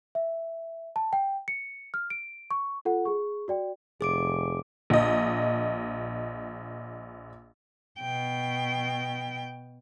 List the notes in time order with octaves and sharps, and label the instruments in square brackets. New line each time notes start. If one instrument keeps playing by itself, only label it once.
[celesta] E5
A5
G5
C#7
F6
D7
C#6
F4 A4 F#5
G#4 C#6
F#4 D5 G5
[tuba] F1 [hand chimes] G#4 D6 D7
[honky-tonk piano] A#1 D#5
[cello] B2 G5